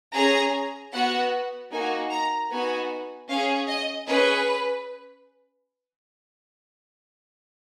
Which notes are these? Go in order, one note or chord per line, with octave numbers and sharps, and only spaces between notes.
C#4 G#4 A#5
B3 F#4 F#5
A#3 D#4 F#4 G#5
A#5
B3 D#4 F#4 G#5
C#4 G#4 F5
D#5
C#4 G#4 B4